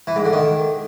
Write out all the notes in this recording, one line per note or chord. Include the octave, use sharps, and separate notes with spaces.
E3
G#2
D3
D#3